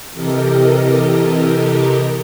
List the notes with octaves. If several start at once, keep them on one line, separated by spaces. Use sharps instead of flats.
C3 E3 G4 A4 A#4 D#5